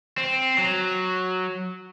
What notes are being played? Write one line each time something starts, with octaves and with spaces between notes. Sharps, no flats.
C4
F#3